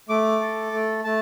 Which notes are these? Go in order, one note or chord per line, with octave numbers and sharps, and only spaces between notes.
A3 D6
A4
A3
A3 A5